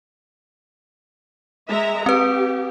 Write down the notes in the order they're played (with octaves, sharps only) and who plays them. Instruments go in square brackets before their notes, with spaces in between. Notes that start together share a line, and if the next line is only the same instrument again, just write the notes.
[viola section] G#3 E5 A#5
[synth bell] C4 B4 [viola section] G4